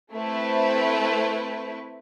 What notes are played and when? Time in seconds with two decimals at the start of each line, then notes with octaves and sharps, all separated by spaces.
0.12 A3 C4 E4 B4